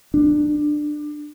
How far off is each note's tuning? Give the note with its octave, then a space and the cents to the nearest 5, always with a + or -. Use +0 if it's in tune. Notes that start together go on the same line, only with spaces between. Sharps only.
D4 +20